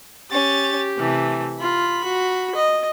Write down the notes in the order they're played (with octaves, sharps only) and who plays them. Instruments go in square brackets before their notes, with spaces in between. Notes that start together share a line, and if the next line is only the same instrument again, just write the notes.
[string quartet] C#4 A6 [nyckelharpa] G4
[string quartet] C3 E3 A3
[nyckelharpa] F4 [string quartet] B5
[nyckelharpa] F#4
D#5